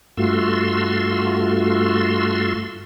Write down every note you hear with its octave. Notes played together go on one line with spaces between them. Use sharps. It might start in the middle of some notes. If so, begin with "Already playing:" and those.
G2 A3 F4 F#4 C6 E6